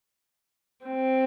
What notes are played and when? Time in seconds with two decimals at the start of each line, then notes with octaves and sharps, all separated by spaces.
0.86 C4